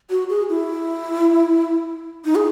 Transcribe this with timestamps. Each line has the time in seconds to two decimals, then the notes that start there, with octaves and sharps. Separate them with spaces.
0.10 F#4
0.30 G#4
0.49 E4
2.25 D#4
2.35 G#4